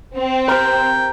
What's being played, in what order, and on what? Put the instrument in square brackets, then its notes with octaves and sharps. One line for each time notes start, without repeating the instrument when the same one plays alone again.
[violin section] C4
[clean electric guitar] G4 A#4 [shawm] G5